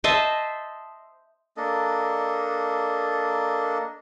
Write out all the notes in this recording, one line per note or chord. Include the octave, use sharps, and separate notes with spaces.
C5 D#5 E5 A5
A#3 D4 A4 D#5